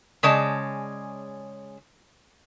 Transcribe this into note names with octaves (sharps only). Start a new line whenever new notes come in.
C#3 G#3 C#4 D5 A5